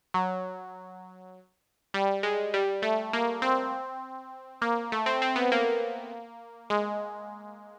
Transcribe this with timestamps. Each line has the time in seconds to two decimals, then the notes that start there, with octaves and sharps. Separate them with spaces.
0.14 F#3
1.94 G3
2.23 G#3
2.54 G3
2.82 A3
3.13 A#3
3.42 C4
4.62 A#3
4.92 A3
5.06 C4
5.22 C4
5.36 B3
5.52 A#3
6.70 G#3